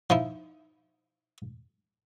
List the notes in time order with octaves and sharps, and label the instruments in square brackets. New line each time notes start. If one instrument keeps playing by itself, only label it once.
[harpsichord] F3 D#4 E4